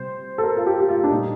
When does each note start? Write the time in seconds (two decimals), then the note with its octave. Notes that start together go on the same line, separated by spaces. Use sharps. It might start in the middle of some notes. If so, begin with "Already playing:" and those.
Already playing: C3 G3 C5
0.38 A4
0.43 A#4
0.57 F4
0.66 G4
0.80 G4
0.89 F4
1.04 D4
1.10 A#2 G3 D#4